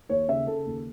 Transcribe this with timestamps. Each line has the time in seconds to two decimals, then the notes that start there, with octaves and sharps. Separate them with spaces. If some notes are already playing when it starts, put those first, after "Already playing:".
0.09 D#2 C#5
0.28 C#3 E5
0.47 C#3 A4
0.66 D#2